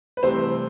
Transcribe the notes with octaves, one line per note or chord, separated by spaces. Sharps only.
B4
C2 C3 E3 A3 C4 C5